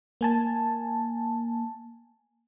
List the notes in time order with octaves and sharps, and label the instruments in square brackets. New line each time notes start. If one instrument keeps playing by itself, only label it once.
[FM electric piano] A#3 G#5 A5